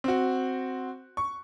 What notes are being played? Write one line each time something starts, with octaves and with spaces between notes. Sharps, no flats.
C4 F#4
C#6